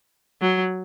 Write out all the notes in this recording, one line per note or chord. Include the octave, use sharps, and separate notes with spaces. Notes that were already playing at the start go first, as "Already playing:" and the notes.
F#3